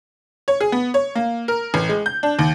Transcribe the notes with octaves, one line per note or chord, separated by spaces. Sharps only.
C#5
G#4
B3
C#5
A#3
A#4
A1
G#3
G6
D4
D#2